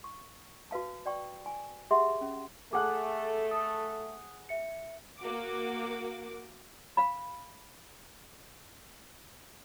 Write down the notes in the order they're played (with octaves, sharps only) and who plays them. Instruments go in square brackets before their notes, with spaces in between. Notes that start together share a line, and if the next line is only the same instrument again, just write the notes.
[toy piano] C#6
F#4 B4 F5 A5
D5 G5 C#6
G#5
G4 G#4 E5 F#5 C6
C#4
[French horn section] A3 A4 [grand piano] G#4 F#5 F#6 [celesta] D6
[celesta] D#6
E5 C#7
[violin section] A#3 F#4 D6
[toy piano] F5 B5